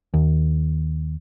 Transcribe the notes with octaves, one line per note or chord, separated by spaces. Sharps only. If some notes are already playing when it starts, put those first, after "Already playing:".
D#2